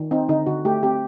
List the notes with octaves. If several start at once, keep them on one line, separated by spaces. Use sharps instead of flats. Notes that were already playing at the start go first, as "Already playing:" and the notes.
Already playing: D#3
C4 D#4
D3 D#4
D3 F#4
A3 G4
C4 G4